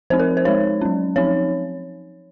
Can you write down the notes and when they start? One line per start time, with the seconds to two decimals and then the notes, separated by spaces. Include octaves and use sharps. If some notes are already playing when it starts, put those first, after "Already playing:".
0.10 F3 C4 D#4 C5
0.19 A#4
0.37 C5
0.45 G#3 D#4 C#5
0.81 F#3 C#4
1.16 F3 C4 D#4 C#5